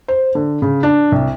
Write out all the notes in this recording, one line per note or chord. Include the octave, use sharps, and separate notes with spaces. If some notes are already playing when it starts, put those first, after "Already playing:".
C5
D3
C#3
D4
C2